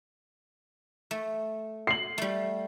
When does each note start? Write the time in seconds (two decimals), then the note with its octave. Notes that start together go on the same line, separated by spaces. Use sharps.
1.11 A3
1.87 C7 F#7
2.18 G3 A3